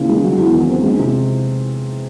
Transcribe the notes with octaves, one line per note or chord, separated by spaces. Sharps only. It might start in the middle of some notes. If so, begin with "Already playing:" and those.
Already playing: D#2 C#3 E3
G#3
F#3
E2
D#3
C4
G#3
C3